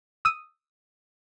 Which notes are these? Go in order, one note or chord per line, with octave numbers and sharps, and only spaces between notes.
D#6 E6 D#7